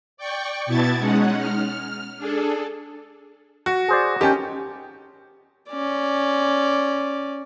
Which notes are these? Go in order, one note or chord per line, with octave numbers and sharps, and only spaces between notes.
D5 G5 C#6
B2 B3 E4 A5 G#6 A6
G#3 C#4 D#4 F#5
F6
D4 G#4 A4
F#4
G#4 C5 D5
D#3 C#4 G4 G5 A5
C#4 D5